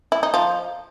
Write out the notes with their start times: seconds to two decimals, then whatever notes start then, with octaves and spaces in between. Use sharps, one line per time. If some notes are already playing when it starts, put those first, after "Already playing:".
0.12 E4
0.23 D#4
0.34 F3